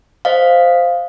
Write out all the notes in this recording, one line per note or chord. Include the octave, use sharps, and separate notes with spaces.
C5 D#5 F5